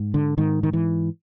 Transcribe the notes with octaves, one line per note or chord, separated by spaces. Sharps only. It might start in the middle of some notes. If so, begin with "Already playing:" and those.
Already playing: G#2
D3
G#2 D#3
D#3
E3